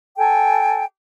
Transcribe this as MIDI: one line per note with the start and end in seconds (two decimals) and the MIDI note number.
0.18 0.84 69
0.18 0.84 79
0.18 0.84 80